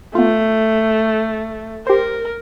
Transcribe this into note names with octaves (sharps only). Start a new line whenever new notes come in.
A3 B3 F4
G4 A#4 C5